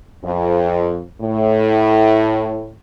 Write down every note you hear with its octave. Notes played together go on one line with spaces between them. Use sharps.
F2
A2